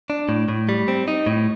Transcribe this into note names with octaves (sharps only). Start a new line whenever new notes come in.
D4
A2
A2
G3
C4
D#4
A2